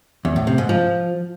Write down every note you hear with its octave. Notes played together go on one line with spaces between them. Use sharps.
E2
A2
C3
G#2
F3